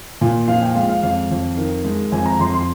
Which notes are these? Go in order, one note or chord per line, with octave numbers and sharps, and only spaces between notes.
A#2
F3 F5
G5
G#3 F5
F5
F2 F5
F2
D#3
G#3
F2 G#5
A#5
F2 C6
C6